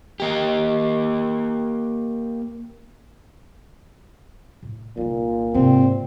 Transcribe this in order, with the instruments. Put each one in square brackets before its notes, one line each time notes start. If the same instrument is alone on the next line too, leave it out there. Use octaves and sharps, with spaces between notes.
[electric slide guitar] A#3 G4
[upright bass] A2
[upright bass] C2 D#4 [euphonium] A#2
[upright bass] G#2 C3 [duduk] C4